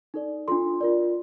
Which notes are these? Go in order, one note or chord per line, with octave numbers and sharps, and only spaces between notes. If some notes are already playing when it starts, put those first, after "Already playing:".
D#4 A4 D5
D4 F4 A4 C6
F4 A#4 D5